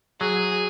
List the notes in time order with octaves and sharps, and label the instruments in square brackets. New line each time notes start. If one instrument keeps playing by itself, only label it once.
[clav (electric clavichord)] F#3 [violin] G#4